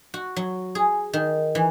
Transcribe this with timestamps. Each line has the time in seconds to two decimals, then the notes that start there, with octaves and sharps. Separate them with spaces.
0.14 F#4
0.36 F#3
0.75 G#4
1.13 D#3
1.55 E3